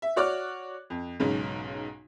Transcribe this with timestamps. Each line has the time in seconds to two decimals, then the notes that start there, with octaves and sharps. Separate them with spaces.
0.02 E5
0.16 F#4 C#5 D5 D6 F6 F#6
0.90 F2
1.20 B1 G#2 C#3